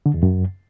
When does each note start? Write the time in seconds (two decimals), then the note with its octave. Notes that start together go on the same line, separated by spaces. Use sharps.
0.06 D3
0.14 E2
0.23 F#2